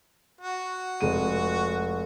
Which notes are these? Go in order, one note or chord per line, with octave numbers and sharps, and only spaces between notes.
F#4
F1 G#3 D#7